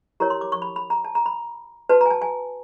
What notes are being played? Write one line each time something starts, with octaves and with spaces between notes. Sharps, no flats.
E4 G4 A#4 C#5 A#5
C6
D6
C#6
B5
B5
A#5
A5
A#5
B5
F#4 B4 A5
A#5
G#5
A5
G#5